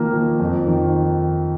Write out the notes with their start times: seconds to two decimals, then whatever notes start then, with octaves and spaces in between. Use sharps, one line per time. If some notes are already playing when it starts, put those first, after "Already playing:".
Already playing: D#3 F3 A#3
0.13 F3
0.40 F2
0.67 D#3